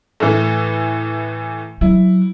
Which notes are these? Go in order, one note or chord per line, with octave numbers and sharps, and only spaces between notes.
A2 E3 A3
F#3 E4